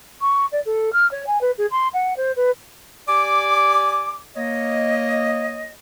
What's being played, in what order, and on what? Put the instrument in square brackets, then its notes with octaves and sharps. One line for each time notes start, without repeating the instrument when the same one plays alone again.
[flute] C#6
D5
A4
F6
C#5
G#5
B4
G#4
C6
F#5
C5
B4
[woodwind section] G4 D5 G#5 D6
A#3 C#5 D#5